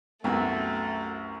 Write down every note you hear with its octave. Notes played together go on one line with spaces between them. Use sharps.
C2 F#2 A3 B3 F#4